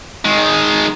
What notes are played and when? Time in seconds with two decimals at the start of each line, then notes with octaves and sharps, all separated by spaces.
0.25 D#3 G#3